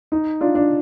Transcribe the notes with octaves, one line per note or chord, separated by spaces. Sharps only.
D#4
D4 F4
D4